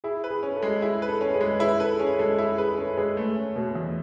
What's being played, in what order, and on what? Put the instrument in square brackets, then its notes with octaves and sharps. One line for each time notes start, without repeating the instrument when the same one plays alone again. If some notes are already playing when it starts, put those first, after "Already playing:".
[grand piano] E4 [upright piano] G#4
[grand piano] B4
[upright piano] G#4
[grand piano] C#4
[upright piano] A4
[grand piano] G#3
[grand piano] E4 [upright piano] G#4
[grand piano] B4
[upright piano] A4
[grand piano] C#4
[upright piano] G#4 B4
[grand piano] G#3
[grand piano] E4 [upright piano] G#4 B4
[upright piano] A4 [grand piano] B4
[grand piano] C#4 [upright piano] G#4
[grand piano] G#3 [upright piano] A4
[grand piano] E4 [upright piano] G#4
[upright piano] G#4 [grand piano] B4
[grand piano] C#4 [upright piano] A4
[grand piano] G#3 [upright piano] G#4 B4
[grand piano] A3
C#4
B2
E2